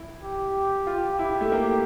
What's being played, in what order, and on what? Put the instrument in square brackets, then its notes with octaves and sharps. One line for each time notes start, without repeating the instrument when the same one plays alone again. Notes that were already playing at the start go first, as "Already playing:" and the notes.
Already playing: [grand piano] E4
[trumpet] G4
[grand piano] F4
E4
A3
A#3